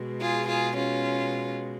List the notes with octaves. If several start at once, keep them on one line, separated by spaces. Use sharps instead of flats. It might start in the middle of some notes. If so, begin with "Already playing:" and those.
Already playing: B2 G#3
F4 G#4
F4 G#4
C#4 F4